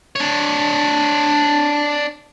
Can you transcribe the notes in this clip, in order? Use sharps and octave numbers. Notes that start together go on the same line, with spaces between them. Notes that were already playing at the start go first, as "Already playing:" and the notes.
D4 C#5